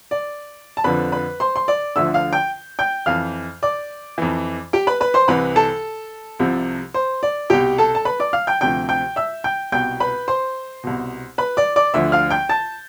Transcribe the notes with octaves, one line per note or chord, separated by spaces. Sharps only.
D5
A5
F2 D3 F3 B4 B5
B4 B5
C5 C6
C6
D5 D6
D2 D3 F3 E5 E6
F5 F6
G5 G6
G5 G6
F2 E3 F5 F6
D5 D6
F2 E3
G4 G5
B4 B5
B4 B5
C5 C6
C2 C3 E3 B4 B5
A4 A5
C2 C3 F3
C5
D5
C2 B2 G4 G5
A4 A5
A5
B4 B5
D5 D6
F5 F6
G5 G6
D2 C3 F3 G5 G6
G5 G6
E5 E6
G5 G6
C2 B2 G5 G6
B4 B5
C5 C6
C2 B2
B4 B5
D5 D6
D5 D6
D2 D3 F3 E5 E6
F5 F6
G5 G6
A5 A6